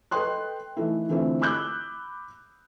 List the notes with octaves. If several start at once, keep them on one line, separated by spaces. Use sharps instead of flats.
A4 B4 D#5 G5 C6 F#6
E3 A3 D#4 E4
D3 E3 A3 C4 E4 F4
B5 D6 E6 F#6 G6